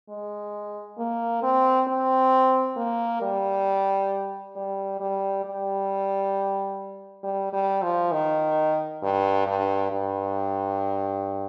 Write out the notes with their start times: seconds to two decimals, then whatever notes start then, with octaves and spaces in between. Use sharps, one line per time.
0.09 G#3
0.98 A#3
1.43 C4
1.88 C4
2.77 A#3
3.22 G3
4.56 G3
5.00 G3
5.45 G3
7.24 G3
7.53 G3
7.83 F3
8.12 D#3
9.03 G2
9.47 G2
9.92 G2